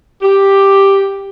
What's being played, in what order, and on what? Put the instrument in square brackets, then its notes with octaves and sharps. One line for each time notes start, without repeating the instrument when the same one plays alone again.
[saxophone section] G4